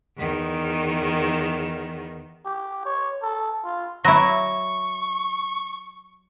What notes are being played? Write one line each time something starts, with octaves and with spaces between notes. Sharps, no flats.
E2 D#3
G4
C#5
A4
F4
F#3 E4 B5 C#6 A#6